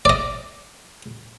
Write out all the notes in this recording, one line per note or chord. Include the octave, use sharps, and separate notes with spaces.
D5 D#5